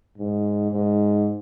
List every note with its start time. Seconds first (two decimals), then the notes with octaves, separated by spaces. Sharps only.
0.18 G#2
0.72 G#2